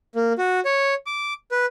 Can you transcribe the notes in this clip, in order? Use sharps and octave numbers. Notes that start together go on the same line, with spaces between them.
A#3
F#4
C#5
D6
B4